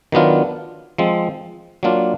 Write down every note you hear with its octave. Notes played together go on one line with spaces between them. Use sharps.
D#3 F#3 B3 D4 F4
F3 G#3 C4
F#3 A#3 D4 F4